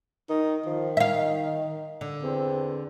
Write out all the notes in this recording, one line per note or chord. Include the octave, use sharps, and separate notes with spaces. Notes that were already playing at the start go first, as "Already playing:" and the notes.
D#3 D#4
D#3 F3
D#4 E5 F5
D3
E2 C4